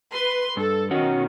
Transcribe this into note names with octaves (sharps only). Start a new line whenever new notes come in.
B4 C6
G2 A4
B2 D#3 C#4 F#4